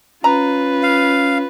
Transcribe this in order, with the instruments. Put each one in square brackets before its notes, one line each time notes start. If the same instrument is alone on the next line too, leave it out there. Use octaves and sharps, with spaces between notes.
[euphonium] C#4 [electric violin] F4 B4 [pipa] A#5
[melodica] F5